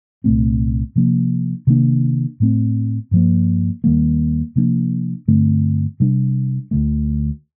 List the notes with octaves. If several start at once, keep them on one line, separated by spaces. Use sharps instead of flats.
C2 A#2 A3 C4
C3 F3 A#3 D4
C3 D#3 A#3 D4
A2 A3 C4
G2 F3 A#3
D#2 D#3 G3 A#3
C3 F3 A#3 D4
G2 D3 A3 C4
C3 G3 D4
D2 D3 F3 A3